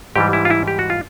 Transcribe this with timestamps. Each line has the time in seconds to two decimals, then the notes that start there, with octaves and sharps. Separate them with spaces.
0.16 G#2 E3 G3 G4
0.33 E4
0.45 F4
0.50 E4
0.68 G4
0.79 F#4
0.90 F4